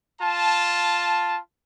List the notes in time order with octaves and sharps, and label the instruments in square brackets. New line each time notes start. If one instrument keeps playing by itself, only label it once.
[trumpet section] F4 A5